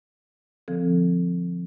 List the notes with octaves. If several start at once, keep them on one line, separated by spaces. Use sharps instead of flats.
D3 F3 C4 A4